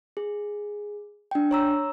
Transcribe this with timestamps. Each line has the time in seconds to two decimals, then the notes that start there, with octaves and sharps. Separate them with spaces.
0.17 G#4
1.31 D4 G5
1.51 C#5 A#5 E6